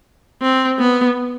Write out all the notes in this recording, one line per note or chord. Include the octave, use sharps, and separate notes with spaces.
C4
B3